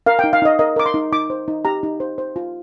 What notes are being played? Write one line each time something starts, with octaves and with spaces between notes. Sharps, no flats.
A#4 F5
D#4 G5
F5
D#4 D#5
A#4 D#5
A#4 D6
C6
D#4
D#4 D6
C5
D#4
G4 A#5
D#4
C5
C5
F4